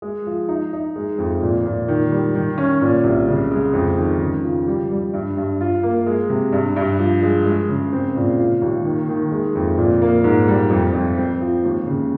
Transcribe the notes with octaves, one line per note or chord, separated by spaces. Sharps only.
G#3
F3
D#4
D#4
G#3
F2
A#2
A#2
D#3
G3
D#3
C#4
A#2
C2
C#3
G#3
F2
D#3
C#3
F3
G3
G3
G2
G2
F4
A#3
G#3
C3
G2
G2
F3
G#3
G#3
C#3
C4
A#2
F4
D#2
D#3
D#3
G#3
F2
A#2
A#3
G#2
G3
F2
F2
C4
F3
D#2
C#3